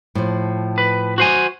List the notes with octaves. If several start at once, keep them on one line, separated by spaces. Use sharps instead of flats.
A2 F3
B4
F#4 C5 G#5